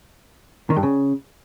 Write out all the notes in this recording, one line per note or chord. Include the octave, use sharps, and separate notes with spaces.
D#3
G2
C#3